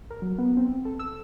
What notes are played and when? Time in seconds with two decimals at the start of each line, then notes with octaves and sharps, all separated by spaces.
0.10 A#4
0.22 F#3
0.38 B3
0.57 C4
0.85 A4
0.99 E6